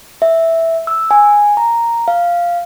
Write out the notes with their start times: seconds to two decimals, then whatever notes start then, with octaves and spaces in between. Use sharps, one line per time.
0.22 E5
0.87 E6
1.11 G#5
1.57 A#5
2.08 F5